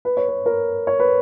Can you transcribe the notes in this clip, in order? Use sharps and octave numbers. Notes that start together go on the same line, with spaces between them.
B4
C#5
B4
A#4
C#5
B4